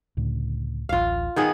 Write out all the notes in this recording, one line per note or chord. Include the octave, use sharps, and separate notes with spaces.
C#2 A2 D3
D1 A1 F4 F5
D#3 B3 G#4